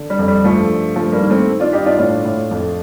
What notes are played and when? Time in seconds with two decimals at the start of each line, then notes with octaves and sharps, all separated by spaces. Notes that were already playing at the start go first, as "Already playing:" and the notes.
Already playing: D3
0.10 G3
0.19 F2
0.28 G3
0.44 G2 F3 A3
0.71 G2
0.95 G2 F3 A3
1.13 G3 A#3
1.22 D#3
1.30 A3 C4
1.48 D#3
1.60 D4 F4
1.73 G2 D#4 G4
1.86 D4 F4
1.99 A2 D4 F4
2.25 A2
2.51 F2